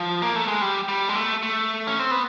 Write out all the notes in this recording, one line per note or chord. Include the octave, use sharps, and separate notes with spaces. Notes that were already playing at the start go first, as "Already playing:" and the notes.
Already playing: F3
A#3
A3
G#3
G3
G3
G#3
A3
A3
C#4
C4
B3